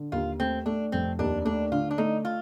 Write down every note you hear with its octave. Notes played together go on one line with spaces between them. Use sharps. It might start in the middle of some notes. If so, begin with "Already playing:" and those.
Already playing: D3
D#2 F4
A3 C4
A3 D4
F1 C4
D#2 D4
A3 D4
D3 F4
D4
A3 D#4
F4